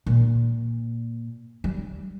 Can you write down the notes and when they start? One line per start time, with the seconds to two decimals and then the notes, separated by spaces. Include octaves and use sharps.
0.06 A#2
1.64 G3